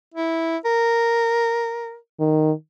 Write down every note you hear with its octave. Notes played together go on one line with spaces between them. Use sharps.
E4
A#4
D#3